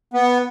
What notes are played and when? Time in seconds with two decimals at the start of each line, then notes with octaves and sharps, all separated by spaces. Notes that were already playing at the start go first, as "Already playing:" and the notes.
0.14 B3